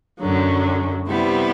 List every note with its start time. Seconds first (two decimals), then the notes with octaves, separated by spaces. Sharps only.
0.21 F#2 D3 F#3
1.08 C3 G3 B3 E4